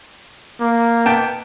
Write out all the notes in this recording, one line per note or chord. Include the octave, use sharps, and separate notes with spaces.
A#3
B3 G5 A5